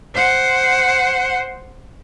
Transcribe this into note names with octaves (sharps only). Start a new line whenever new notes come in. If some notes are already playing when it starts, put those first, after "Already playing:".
C5 F#5